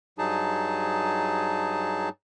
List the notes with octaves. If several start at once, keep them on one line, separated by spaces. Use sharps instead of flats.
G2 F#3 D#4 G#4 A5